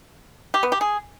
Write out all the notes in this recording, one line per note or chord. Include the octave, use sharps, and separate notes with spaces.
G4
B3
G4
G#4